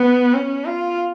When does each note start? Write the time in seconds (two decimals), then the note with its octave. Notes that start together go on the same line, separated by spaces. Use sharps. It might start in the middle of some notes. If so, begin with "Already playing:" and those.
Already playing: B3
0.34 C#4
0.65 F4